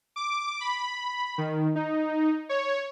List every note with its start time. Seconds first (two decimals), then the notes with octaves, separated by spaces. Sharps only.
0.16 D6
0.61 B5
1.38 D#3
1.75 D#4
2.49 C#5